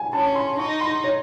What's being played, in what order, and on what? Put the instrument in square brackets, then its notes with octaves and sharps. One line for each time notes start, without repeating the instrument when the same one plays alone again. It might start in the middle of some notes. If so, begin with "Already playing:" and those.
Already playing: [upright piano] G#5
[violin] C#4 [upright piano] A5
[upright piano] C6
[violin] D#4 [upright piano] C#6
[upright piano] C6
C#5